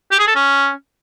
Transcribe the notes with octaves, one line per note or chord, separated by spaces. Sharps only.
G4
G#4
A4
C#4